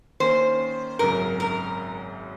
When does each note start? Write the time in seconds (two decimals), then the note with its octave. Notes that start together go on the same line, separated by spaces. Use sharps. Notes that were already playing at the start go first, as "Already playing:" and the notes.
0.20 D#3 A#3 C#4 C5
0.99 G#1 F#2 C#3 F#3 A#4
1.40 A#4